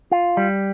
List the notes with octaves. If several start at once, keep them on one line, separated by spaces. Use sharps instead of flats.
F4
G3